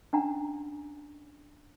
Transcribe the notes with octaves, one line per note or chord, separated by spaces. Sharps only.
C#4 D4 F#5 A#5